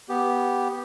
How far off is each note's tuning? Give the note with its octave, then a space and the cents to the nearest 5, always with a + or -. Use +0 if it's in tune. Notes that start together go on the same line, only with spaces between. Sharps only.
B3 -5 G4 +0